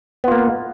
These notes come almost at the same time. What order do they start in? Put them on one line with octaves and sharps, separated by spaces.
B3 F4 A#3